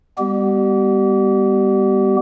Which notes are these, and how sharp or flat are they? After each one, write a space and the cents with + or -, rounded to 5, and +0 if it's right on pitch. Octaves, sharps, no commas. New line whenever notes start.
G3 +30 B3 +0 G4 -35